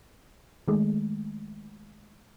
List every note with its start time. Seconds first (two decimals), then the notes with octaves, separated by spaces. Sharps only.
0.68 D#3 G#3 A3